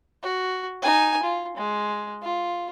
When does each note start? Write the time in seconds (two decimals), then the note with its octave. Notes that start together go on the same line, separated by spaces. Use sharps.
0.22 F#4
0.82 D#4 G#5
1.23 F4
1.56 G#3
2.22 F4